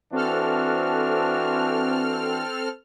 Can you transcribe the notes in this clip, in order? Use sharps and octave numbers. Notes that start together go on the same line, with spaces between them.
E3 C4 D4 F#4 A4 F6